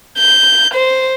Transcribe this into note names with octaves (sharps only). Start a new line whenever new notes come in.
G6
C5